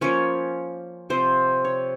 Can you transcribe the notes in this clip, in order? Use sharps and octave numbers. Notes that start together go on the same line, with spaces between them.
F3 A#3 C#4 C#5
C3 F3 C4 C5
C#5